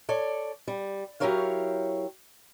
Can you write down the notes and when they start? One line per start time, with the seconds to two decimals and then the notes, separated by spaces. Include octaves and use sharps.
0.09 A4 C#5 D5
0.68 G3
1.20 F#3 E4 G4 A#4 C#5 F5